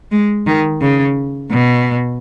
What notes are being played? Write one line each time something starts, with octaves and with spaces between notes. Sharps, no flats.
G#3
D#3
C#3
B2